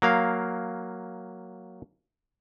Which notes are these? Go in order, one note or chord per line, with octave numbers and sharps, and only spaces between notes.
F#3 A#3 F5